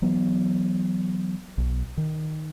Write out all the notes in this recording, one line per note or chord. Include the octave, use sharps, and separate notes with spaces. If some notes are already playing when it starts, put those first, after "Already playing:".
E3 F#3 B3
B1
D#3